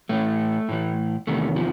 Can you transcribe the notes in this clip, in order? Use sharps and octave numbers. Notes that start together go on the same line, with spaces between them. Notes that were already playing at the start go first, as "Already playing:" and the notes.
A2 E3 A3
A2 E3
E2 C3 D#3 A3
F3